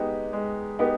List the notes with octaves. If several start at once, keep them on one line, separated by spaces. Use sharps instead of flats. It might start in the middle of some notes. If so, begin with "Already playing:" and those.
Already playing: G#3 B3 D#4 G4
G#3
B3 D#4 G4